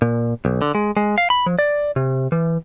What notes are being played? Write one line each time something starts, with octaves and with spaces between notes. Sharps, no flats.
A#2
B1
D3
G#3
G#3
F5
B5
F3
D5
C3
E3